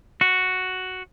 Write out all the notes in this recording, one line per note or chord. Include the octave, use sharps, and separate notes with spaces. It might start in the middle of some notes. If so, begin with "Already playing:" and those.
F#4